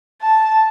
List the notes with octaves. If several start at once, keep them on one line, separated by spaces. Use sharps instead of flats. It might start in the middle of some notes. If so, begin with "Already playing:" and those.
A5